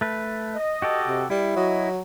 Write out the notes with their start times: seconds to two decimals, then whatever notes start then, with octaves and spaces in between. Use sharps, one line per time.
0.01 A3 B4
0.54 D#5
0.82 F#4 G4 A4
1.08 C3
1.30 G3 E4
1.56 F#3 F#4 D#5